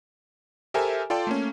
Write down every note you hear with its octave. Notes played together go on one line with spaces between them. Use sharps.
G4 A4 A#4 C5 E5 G#5
F4 A4 D5 G5 A5 C6
A3 A#3 C#4